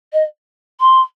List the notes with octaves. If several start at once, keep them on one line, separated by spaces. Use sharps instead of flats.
D#5
C6